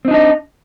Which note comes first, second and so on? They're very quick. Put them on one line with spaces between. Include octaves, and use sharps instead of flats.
C4 D#4 D4 D#5